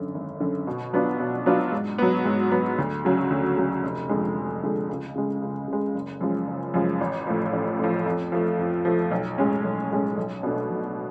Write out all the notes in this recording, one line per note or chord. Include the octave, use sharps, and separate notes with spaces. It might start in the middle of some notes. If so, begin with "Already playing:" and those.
Already playing: G#1 F#2 D3
G#1
F#2 D3
B2
F#3 B3 D4 F4
B2
F#3 B3 D4 F4
G#2
F#3 B3
G#2
F#3 B3
D2
C#3 F#3
D2
C#3 F#3
F1
F2 D3 G#3
F1
F2 D3 G#3
C#2
C#3 G#3
C#2
C#3 G#3
F#1
F#2 F3 G#3
F#1
F#2 F3 G#3
A1
A2 F3
A1
A2 F3
F2
F3 A3
F2
F3 A3
B1
A2 G#3 C#4
B1
A2 G#3 C#4
B1
B2 A3 D4
B1